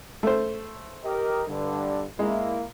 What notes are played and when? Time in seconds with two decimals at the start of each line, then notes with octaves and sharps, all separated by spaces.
0.23 A3 C5
1.04 G4 A#4 D#5
1.47 G2 D3
2.19 G#3 A#3 E4